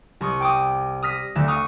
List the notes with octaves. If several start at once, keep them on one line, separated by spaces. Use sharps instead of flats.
C2 C#6 D#6
G5 D6 D#6
D#6 F6 A#6 B6
D2 D3 E5
F5 C#6 D#6